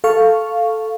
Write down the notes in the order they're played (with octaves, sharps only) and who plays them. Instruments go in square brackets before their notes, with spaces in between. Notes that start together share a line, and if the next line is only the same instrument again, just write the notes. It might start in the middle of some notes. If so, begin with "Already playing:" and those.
[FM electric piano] A4 F5 C#6